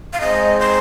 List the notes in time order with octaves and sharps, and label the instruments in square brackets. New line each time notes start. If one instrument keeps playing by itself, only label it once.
[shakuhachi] F5
[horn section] G#3 C4 D#4 G#4 [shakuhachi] D#5
[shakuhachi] C5